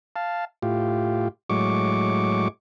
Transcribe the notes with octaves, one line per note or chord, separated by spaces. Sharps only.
F5 A5
A2 F4 G4
A2 F#3 G#3 C#6 D6